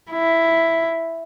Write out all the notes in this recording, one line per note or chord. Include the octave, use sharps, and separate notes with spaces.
E4